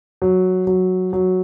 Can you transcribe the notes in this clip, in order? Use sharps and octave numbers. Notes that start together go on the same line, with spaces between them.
F#3
F#3
F#3